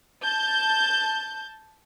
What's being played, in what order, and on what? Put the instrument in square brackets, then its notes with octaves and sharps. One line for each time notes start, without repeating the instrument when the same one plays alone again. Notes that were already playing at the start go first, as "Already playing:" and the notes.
[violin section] A5 G6